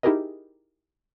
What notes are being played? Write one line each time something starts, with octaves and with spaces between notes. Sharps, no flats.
D#4 E4 G4 G#4 A#4 D#5